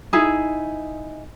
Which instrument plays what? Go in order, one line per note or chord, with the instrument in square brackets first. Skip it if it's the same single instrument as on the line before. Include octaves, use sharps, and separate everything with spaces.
[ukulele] D#4 E4 G#4